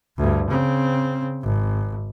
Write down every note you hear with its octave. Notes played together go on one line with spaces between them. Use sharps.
D2 G2
C#3 C4
G#1